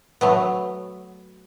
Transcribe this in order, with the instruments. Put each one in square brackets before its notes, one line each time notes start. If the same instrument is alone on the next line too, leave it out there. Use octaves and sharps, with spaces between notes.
[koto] F#3 A3 B3